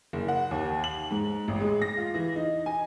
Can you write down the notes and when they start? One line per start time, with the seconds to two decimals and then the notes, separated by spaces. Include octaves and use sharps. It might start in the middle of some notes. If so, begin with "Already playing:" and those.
0.13 F#1
0.28 F#5
0.51 D#2
0.84 F#7
1.11 G#2
1.48 A1
1.60 G#3
1.82 A#6
1.97 F4
2.14 E3
2.36 D#4
2.66 G#5